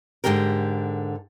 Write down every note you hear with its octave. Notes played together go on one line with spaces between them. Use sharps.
G#2 B2 D3 G4 A#4